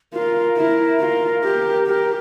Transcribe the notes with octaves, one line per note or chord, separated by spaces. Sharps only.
F4 A#4
E4
F4
G4
G4 A#4